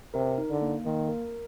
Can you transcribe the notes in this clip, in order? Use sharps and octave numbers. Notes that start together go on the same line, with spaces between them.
C3 A#4
D#4
D3
A#3
D#3 A#3
A#4